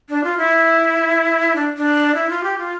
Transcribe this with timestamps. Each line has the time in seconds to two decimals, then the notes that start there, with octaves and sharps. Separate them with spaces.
0.09 D4
0.24 F4
0.38 E4
1.56 D4
1.77 D4
2.15 E4
2.29 F4
2.44 G4
2.58 F4